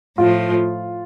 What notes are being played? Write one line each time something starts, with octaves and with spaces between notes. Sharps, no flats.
A2 F3 A3 F4